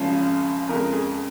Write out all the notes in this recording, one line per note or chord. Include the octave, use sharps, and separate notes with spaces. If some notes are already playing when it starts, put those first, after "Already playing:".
Already playing: G#1 F#2 C#3 F3
F2 C#3 G#3 A#4
G#4